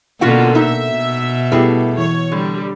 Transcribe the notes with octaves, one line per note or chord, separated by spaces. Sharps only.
B2 D3 A#3 C#4 F4 F#4 F#5
D#4 E5
B2
G3 A3 B3 E4 G4 G#4
E3 C#5
D3 G3